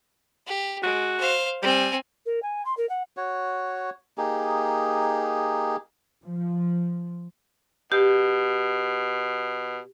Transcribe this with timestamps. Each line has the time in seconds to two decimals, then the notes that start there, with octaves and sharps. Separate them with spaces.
0.47 G4
0.83 G#3 F#4
1.20 C5 F5
1.62 G3 C4 G#5
2.25 A#4
2.42 G#5
2.65 C6
2.77 A#4
2.89 F#5
3.17 F#4 C#5
4.18 A#3 D#4 G4 G#4
6.25 F3
7.92 B2 G4